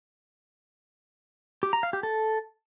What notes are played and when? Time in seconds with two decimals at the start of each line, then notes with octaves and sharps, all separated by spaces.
1.63 G4
1.73 A#5
1.83 F5
1.93 G4
2.03 A4